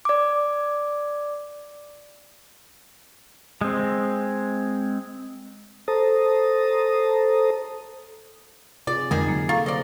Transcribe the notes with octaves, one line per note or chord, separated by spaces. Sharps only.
D5 D6
G#3 C4
A4 C5 A5 A#5 D#6
C3 F4 G#4 D5
F2 D3 D#3 G#3 G#4 A#4
F#3 A#3
D3 F4 A4 A#5 C#6
C5 D5 D#5